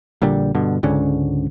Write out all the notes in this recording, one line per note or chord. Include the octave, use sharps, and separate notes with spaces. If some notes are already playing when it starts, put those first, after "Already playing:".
A#1 A#2 D3 G3
G2 B2 D3
C#2 G#2 D3 C#4